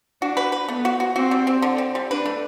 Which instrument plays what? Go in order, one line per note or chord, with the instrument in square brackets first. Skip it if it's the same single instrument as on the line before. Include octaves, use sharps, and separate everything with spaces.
[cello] D4 [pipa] F#4
[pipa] B4
B4
[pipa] A3 [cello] B3
[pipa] F#4
F#4
[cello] C4 [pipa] F#4
[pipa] G3
C4
D3
C4
G3
[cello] D4 [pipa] B4
[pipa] A3